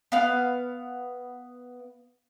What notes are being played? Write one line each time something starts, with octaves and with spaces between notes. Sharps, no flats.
B3 F5